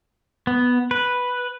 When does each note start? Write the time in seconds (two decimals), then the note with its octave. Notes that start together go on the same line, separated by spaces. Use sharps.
0.47 B3
0.91 B4